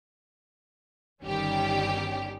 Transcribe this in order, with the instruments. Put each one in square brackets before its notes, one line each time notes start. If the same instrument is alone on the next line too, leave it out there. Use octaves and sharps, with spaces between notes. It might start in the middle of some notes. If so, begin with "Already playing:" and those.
[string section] G1 D#3 G3 C#4 G4